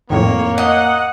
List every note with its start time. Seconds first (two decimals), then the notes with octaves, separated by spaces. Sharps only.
0.10 F2 A2 D#3 A#3 C#5
0.58 D#5 F#5